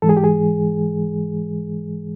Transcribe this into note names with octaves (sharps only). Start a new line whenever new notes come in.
G#2 E3 G#3 A4
G#4
G4
G#4